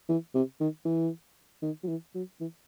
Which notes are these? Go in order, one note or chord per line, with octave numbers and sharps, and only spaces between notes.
E3
C3
D#3
E3
D#3
F#3
E3
F#3
E3